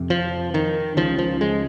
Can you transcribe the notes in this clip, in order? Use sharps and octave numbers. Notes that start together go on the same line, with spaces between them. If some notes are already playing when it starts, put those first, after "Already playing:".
Already playing: F2 C3
F3
D#3
C#2 C#3 F3
F3
G#3